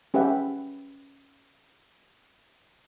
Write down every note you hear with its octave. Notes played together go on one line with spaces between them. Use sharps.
C#4 G4 G#4 B4 E5 F#5